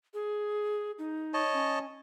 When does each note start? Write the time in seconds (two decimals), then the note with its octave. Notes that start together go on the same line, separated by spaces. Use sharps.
0.14 G#4
0.99 D#4
1.34 C#5 D#5 A5
1.53 C#4